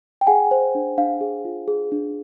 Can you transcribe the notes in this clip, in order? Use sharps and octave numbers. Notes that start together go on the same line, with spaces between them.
G5
G#4 F#5 G#5
C5
D4
D4 F5
G#4
F4
G#4
D4